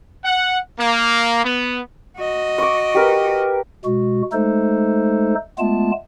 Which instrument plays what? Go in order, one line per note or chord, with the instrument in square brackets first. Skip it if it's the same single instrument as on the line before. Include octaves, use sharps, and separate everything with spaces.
[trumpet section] F#5
A#3
B3
[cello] F#4 D#5
[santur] C#6 D6
G4 A#4 B4
[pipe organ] B2 G#3 F#4
G#3 A3 D#4 A4 C5
G#3 A3 B3 F4 A5